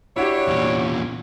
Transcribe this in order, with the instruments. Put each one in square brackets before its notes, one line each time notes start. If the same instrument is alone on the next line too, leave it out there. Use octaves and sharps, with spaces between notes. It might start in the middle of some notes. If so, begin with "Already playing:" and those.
[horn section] D4 C#5 [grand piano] E4 F#4 G4
[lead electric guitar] E2 A#2